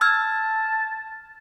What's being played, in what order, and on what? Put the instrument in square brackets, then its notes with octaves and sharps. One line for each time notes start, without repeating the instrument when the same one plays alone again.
[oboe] A5 [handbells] E6 F6 G#6